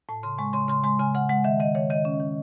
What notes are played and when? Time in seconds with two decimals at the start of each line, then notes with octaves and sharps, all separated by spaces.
0.09 A2 A5
0.23 C#3 C6
0.38 G#3 C#6
0.53 C#3 C6
0.68 C#3 C6
0.83 G#3 C6
0.99 C#3 G#5
1.15 C#3 F#5
1.30 G#3 F#5
1.44 D#3 E5
1.60 D#3 D#5
1.75 D#3 C#5
1.90 D#3 D#5
2.05 C#4
2.20 D#3